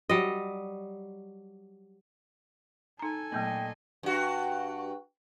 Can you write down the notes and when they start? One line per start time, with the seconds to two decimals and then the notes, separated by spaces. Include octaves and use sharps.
0.09 F#3 G3 D#5
2.99 D#4 A4 G#5 A#5
3.32 A#2 F#3 A3 B3 D#5 G5
4.03 G2 F#4